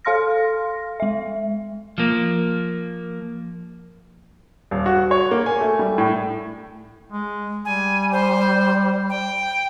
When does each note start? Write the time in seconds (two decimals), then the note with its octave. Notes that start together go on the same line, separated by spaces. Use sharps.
0.05 A4 F5 C6 F6 A#6
1.00 G#3 E5
1.98 F3 A#3
4.71 D#1
4.86 F#4
5.11 C#5
5.31 A#3
5.46 G#5
5.60 A3
5.79 G3
5.98 A2
7.12 G#3
7.65 G3 G#5
8.12 C5
9.09 G5